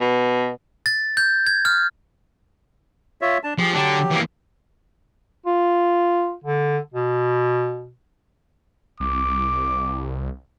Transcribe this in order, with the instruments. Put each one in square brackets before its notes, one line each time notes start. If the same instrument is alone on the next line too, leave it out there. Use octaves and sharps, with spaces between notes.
[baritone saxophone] B2
[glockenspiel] A6
G6
G#6
F6
[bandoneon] F4 C#5 E5
D4 A5
[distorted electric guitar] F3 [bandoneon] G4 G#4
[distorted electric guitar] D3 D4 [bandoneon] F#3 G4
[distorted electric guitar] E3 A#3
[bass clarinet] F4
D3
B2
[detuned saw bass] C2 [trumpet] D6